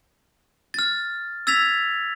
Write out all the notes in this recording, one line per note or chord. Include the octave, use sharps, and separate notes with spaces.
F6 A6
E6 G#6 A6 B6 F7